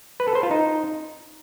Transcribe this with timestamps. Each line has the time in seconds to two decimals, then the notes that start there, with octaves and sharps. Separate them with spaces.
0.20 B4
0.28 A4
0.35 C5
0.43 F4
0.51 D#4